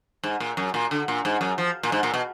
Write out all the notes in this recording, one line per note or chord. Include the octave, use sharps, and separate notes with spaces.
G#2
A#2
F#2
A#2
D3
A#2
G#2
F#2
F3
A#2
G#2
A#2
B2